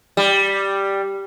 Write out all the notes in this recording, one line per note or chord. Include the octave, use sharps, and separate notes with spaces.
G3